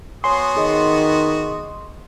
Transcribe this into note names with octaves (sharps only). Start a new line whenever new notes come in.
B3 F#4 C#5 G#5 C6 D#6
D#3 G#4 D#5